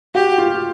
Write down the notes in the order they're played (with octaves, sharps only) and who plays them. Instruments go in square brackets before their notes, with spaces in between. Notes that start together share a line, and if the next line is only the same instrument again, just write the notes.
[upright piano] F#4 [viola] G4
[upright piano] F4